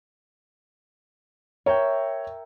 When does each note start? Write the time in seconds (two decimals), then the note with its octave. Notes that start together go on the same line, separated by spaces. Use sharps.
1.66 A#4 C#5 E5 G5